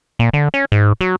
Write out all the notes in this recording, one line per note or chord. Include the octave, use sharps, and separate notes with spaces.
A#2
D3
C#4
G#2
F#3